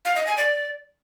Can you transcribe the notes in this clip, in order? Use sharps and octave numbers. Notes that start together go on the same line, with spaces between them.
F5
D#5
G#5
D5